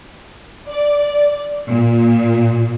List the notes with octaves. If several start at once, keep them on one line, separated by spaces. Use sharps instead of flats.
D5
A#2